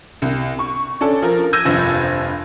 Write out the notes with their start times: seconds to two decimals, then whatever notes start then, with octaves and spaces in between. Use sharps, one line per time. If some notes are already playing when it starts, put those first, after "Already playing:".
0.22 C2
0.59 C#6
1.01 C#4 D4 A4
1.22 F3 A#4
1.53 E6 G6 G#6 A#6 D#7
1.65 F1 G2 F3 A#6